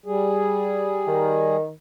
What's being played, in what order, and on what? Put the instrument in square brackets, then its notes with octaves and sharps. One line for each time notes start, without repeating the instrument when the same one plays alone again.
[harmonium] G3 G#4
[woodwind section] D#3